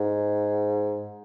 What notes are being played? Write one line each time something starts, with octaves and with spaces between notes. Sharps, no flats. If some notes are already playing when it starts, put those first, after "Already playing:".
Already playing: G#2